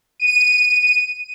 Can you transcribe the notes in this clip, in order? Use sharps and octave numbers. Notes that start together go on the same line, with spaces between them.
D#7